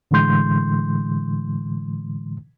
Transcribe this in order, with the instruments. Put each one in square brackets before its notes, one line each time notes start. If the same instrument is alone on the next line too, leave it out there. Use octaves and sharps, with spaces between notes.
[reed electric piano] A2 D3 E3 G#3 C6 G6